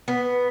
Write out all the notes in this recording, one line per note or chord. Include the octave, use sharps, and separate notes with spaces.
B3